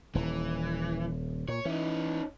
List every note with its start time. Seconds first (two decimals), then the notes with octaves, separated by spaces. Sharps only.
0.15 D#1 E3
1.48 A#2 C#5
1.65 E3 C#4 D#4